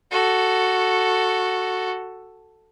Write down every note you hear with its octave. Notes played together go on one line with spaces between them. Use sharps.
F#4 A4